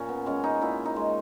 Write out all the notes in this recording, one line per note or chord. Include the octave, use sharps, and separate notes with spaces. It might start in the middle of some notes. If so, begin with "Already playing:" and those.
Already playing: A#2 C#4
B3
G#3 C#4
D#4
A#2 E4
D#4
G#3